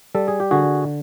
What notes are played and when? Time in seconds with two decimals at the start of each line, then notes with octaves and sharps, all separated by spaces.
0.15 G3 A4
0.28 G#4
0.40 G4
0.51 D3 F#4 G#4